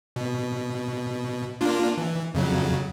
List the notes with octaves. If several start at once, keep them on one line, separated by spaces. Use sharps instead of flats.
B2
A#3 D4 F4
E3
F2 C#3 F#3